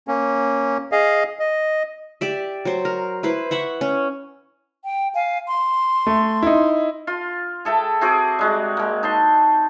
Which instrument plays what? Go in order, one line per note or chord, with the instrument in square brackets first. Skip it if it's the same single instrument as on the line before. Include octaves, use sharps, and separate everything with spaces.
[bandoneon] A#3 C#4
G#4 D#5 F5
D#5
[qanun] G4 D5 E5
F#3 C5
A#4
E4 B4 C5
E5 F#5 B5 C#6
C#4
[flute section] G5
F5 G#5
C6
[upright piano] A3
D#4 E4
[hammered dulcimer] F4 C6
G#4 A4 E5 G5
C4 F#4 G#4 D6
G3 G#3 F#4
G#3 A#3
D#4 A5 C6